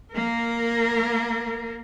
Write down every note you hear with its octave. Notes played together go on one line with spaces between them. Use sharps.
A#3 A#4